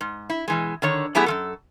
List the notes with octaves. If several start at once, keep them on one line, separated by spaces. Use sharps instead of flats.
G#2
E4
B2 E3 G#3
D3 D#3 C#5
F#3 A3 B3 E4 G4 G#4
F#2 F3 A4